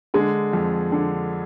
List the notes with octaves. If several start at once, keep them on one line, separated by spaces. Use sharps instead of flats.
D3 G#3
F2
D3